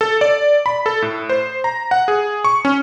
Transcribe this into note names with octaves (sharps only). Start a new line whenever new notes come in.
A4
D5
B5
A4
A2
C5
A#5
F#5
G#4
C#6
C#4